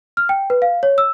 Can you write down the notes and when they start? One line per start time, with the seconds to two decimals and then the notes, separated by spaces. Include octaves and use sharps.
0.17 F6
0.29 G5
0.50 B4
0.62 F5
0.83 C#5
0.98 E6